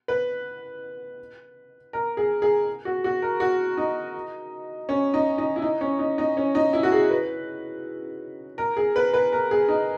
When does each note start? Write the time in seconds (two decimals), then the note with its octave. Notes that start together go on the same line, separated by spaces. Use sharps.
0.08 B4
1.93 A#4
2.17 G#4
2.42 G#4
2.85 F#4
3.04 F#4
3.22 A#4
3.40 F#4
3.77 D#4
4.89 C#4
5.14 D#4
5.38 D#4
5.56 E4
5.62 D#4
5.81 C#4
5.99 D#4
6.18 D#4
6.37 C#4
6.55 D#4
6.73 E4
6.83 F#4
6.92 G#4
7.10 B4
8.58 A#4
8.77 G#4
8.96 B4
9.13 B4
9.32 A#4
9.51 G#4
9.68 D#4